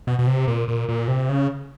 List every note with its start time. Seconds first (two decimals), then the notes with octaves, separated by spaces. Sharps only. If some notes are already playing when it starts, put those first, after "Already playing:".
0.07 B2
0.19 B2
0.27 C3
0.48 A#2
0.68 A#2
0.89 A#2
1.08 C3
1.29 C#3